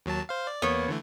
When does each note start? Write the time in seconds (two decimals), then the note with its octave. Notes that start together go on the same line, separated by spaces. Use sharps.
0.06 D#2 F#3 A5
0.29 C5 F5
0.47 D5
0.62 E2 A#3 B3 C#5
0.88 D3 E3 A3